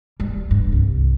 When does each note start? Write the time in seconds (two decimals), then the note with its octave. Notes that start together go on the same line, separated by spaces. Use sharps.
0.20 G3
0.51 G2
0.72 C2